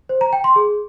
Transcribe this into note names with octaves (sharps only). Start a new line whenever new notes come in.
C5
A#5
G5
C6
G#4